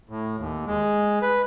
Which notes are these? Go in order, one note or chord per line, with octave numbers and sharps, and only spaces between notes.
A2
D#2
G#3
B4